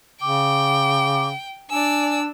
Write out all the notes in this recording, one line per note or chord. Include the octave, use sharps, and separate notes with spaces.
C#3 G5 D6
D4 D5 G#5 E6